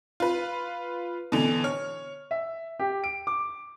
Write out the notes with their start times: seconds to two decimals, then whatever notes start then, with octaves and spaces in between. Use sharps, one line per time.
0.20 F4 B4
1.32 B2 D3 E3
1.64 C#5 F6
2.31 E5
2.79 G4
3.04 D7
3.27 D6